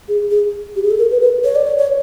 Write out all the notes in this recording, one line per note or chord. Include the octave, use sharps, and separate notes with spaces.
G#4
G#4
G4
G#4
A4
A#4
B4
B4
C#5
D5
C#5
C#5